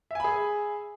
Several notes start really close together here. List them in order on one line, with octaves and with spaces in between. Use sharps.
E5 G#5 B5 G#4